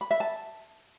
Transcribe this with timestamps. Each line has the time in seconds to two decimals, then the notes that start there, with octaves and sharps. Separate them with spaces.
0.01 B5
0.11 E5
0.20 A5